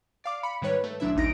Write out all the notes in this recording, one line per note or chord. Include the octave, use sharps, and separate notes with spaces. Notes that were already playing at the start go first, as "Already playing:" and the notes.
D5 F5 D6
B5 C#7
G#2 D#3 G3 B4 C#5
A3
B1 F#3 D4 E4 E5
A1 D2 D#4 A#6 D7